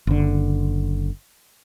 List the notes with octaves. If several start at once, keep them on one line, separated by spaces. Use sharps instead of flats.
F#1 D3